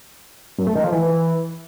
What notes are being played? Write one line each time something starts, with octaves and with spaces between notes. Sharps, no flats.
F#2
A3
D#3
F3
E3